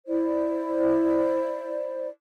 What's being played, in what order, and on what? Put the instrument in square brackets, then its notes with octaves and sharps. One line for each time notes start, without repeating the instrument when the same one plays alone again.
[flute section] E4 C5 D5